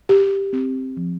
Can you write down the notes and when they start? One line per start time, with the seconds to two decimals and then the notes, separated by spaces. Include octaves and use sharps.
0.09 G4
0.53 C4
0.97 F3